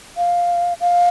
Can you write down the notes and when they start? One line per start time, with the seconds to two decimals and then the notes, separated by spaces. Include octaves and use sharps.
0.17 F5
0.81 F5